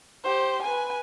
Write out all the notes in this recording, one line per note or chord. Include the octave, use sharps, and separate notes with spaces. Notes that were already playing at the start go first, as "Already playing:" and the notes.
G4 C5
B4 G#5